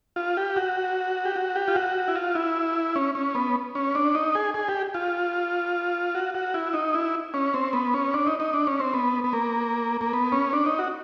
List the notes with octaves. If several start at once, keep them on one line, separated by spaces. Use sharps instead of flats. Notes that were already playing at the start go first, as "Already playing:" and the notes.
F4
G4
F#4
G4
F#4
G4
F4
F#4
E4
F4
E4
C#4
C#4
B3
C#4
D4
D#4
G#4
G#4
G4
F4
F#4
F#4
E4
D#4
E4
C#4
C4
B3
C#4
D4
D#4
D#4
D4
C#4
C4
B3
B3
A#3
A#3
B3
C#4
D4
D#4
F#4